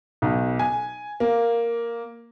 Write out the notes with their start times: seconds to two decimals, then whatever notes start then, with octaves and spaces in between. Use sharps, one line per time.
0.22 B1
0.59 G#5
1.20 A#3